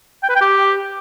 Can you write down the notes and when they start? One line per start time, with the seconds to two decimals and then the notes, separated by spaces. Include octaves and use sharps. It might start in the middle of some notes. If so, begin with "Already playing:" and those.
0.23 G5
0.29 B4
0.35 G5
0.41 G4